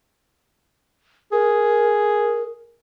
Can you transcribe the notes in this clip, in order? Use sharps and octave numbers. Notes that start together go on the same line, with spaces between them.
G#4 A#4